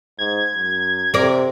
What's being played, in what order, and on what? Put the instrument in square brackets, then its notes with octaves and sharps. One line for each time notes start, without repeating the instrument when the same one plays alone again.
[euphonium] G#2 [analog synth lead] G#6
[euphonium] F#2
[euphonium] C3 [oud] A#4 D5